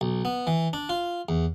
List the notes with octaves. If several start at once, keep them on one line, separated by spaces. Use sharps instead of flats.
B1
B3
E3
D4
F4
E2